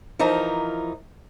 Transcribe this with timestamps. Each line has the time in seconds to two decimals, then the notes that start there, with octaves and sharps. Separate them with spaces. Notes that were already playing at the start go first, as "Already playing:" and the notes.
0.19 E3 F3 D#4 A#4